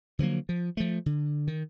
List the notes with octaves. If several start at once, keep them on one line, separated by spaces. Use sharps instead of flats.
D3 F3 F#3 A#3
F3
F3 A3
D3
D#3